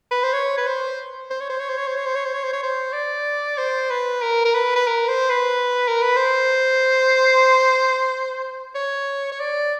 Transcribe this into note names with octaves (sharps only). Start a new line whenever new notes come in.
B4
C5
C#5
B4
C5
C5
C#5
C5
C#5
C5
C#5
C5
C#5
C5
C#5
C5
C#5
C5
C#5
C5
D5
C5
B4
A#4
A#4
B4
B4
A#4
C5
B4
A#4
B4
C5
C#5
C#5
D5